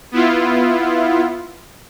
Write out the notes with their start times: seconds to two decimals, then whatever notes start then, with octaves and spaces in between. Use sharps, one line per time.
0.12 B3 E4 F4